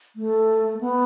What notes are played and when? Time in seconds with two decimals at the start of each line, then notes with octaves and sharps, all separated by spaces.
0.16 A3
0.81 B3